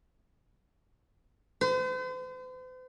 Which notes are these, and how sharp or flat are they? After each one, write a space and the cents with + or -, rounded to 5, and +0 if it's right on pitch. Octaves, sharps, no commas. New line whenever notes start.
C5 -45